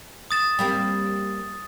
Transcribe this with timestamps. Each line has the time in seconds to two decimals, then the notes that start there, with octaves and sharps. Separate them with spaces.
0.31 D#6 A6 E7
0.59 G3 A#3 C4